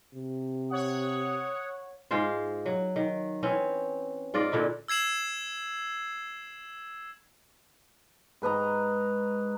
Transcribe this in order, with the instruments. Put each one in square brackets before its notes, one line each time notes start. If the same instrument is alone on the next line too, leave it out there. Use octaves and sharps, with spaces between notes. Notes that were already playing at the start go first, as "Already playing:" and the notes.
[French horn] C3
[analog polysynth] C#5 F#5 [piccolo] D#6
[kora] G#2 G#3 F4 C5
F#3
D#3
E3 C4 C#4
G#2 F4 D5 D#5
A#2 D3 D#4 E4
[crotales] E6 G#6 C7 E7 F#7
[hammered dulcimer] G#2 B4 D#5 A#5